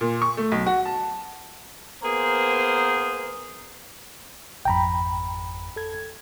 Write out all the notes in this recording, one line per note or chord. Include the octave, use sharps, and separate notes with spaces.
A#2
C#6
A3
B1
F#4
A5
A#3 B3 G#4 A#4 C5
G#1 F2 G5 A#5 B5
A4 G#6